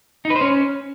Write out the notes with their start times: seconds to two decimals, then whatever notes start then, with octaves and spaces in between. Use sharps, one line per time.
0.25 D#4
0.30 B4
0.36 C5
0.41 C#4